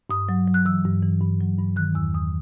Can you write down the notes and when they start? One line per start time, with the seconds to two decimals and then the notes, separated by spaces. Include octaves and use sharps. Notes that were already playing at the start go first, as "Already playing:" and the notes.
0.10 G2 D#6
0.29 F#3
0.47 F#3
0.54 F#6
0.65 E3 E6
0.85 G2
1.02 E3
1.21 G2
1.40 F#3
1.59 G2
1.76 D#3 F#6
1.95 E2 E6
2.14 E2 D#6